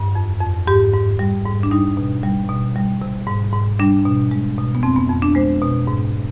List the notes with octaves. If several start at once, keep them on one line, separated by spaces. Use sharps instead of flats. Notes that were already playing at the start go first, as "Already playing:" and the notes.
Already playing: G2
F2
F2
G#2 G4
G#2
G3
G#2
D4
G3 D#4
B2
G3
B2
G3
C3
G#2
G#2
G3 D4
B2
G#3
B2
B3
F2 C4
B3
F2
D4
G#3 C5
B2
G#2